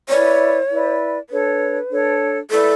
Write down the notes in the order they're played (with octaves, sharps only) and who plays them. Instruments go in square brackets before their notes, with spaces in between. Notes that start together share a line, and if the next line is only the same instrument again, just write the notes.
[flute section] E4 B4 D5 [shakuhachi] C#5
[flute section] E4 B4 D5
[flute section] D4 A4 C#5 [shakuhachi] B4
[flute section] D4 A4 C#5
[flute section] E4 B4 D5 [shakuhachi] A4